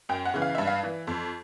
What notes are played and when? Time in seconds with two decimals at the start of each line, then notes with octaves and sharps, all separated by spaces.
0.09 F#2 G5
0.25 F#5
0.34 C#3 E3
0.42 F5
0.55 G2 E5
0.67 F5
0.83 E3
1.07 F2